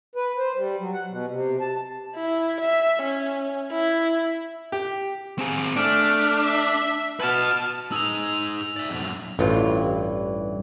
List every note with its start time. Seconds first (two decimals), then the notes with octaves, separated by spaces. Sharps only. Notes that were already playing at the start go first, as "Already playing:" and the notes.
0.16 B4
0.38 C5
0.55 G3
0.79 F#3
0.93 F#5
1.09 B2
1.28 C3
1.61 A5
2.16 E4
2.61 E5
3.03 C#4
3.71 E4
4.72 G4
5.39 C4 G#4
5.76 A3 D4 F6
6.44 E5
7.20 F#4 B4 A5 F6
7.92 D#4 G#4 E6 F7
8.76 D5 E5
8.90 F2 B2
9.02 F#2 A#2
9.39 A1 G2 E3 F4